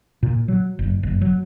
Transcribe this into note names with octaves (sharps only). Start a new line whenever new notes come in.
A#2
F#3
F#1
F#1
F#3